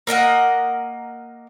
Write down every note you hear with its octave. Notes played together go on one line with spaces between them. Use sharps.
A#3 A#4 D#5 F#5